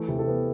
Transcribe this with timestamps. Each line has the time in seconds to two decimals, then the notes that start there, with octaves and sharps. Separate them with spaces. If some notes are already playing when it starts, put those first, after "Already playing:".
Already playing: E3 A3
0.08 C3
0.19 A4
0.28 B3